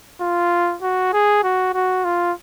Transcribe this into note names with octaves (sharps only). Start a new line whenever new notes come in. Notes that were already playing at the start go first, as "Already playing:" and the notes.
F4
F#4
G#4
F#4
F#4
F4